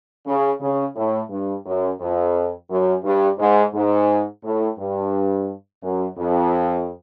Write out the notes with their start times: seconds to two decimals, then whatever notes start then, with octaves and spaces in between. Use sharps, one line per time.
0.26 C#3
0.60 C#3
0.96 A2
1.30 G2
1.66 F#2
2.00 F2
2.70 F#2
3.04 G2
3.39 G#2
3.74 G#2
4.44 A2
4.78 G2
5.82 F#2
6.18 F2